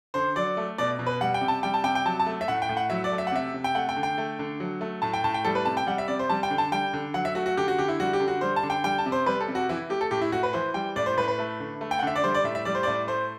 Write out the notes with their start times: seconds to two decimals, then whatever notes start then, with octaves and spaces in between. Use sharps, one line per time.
0.14 D3 C5
0.36 F#3 D5
0.57 A3
0.78 B2 D5
0.99 B2
1.06 B4
1.21 G3 F#5
1.34 G5
1.41 C3
1.48 A5
1.63 G3 G5
1.74 A5
1.84 C3 G5
1.95 G5
2.05 F#3 A5
2.20 A5
2.26 A3
2.41 E5
2.48 A2 F#5
2.62 G5
2.69 A2
2.77 F#5
2.90 F#3 E5
3.04 D5
3.12 A3
3.18 E5
3.27 F#5
3.32 C3 E5
3.54 C3
3.64 G5
3.75 A3 F#5
3.89 G5
3.97 D3
4.03 G5
4.18 A3
4.39 D3
4.60 F#3
4.81 A3
5.02 A2 A5
5.14 G5
5.24 A2 A5
5.34 G5
5.45 G3 A4
5.55 B4
5.65 C3 A5
5.77 G5
5.87 G3 F#5
5.98 E5
6.08 C3 D5
6.19 C5
6.30 G3 A5
6.43 G5
6.50 D3
6.58 A5
6.72 G3 G5
6.93 D3
7.14 F#3 F#5
7.25 E5
7.35 A3 F#4
7.46 F#4
7.57 D3 G4
7.68 F#4
7.78 D3 G4
7.88 E4
8.00 G3 F#4
8.13 G4
8.20 D3
8.28 F#4
8.41 G3 C5
8.56 A5
8.63 D3
8.70 G5
8.84 G3 G5
8.98 A5
9.06 C3
9.12 C5
9.26 G3 B4
9.40 A4
9.48 C3
9.55 F#4
9.69 E3 E4
9.90 A3 G4
10.01 A4
10.11 A2 G4
10.21 E4
10.32 A2 F#4
10.43 B4
10.53 E3 C5
10.74 G3 G5
10.96 A2 D5
11.06 C5
11.17 A2 B4
11.28 B4
11.39 A3
11.60 D3
11.81 A3
11.91 G5
11.99 F#5
12.03 D3 E5
12.16 D5
12.24 G3 C5
12.34 D5
12.44 A2 E5
12.55 E5
12.65 G3 D5
12.75 C5
12.83 A2 D5
13.08 A3 C5